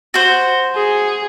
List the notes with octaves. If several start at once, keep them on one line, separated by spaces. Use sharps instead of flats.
F#4 C5
G#4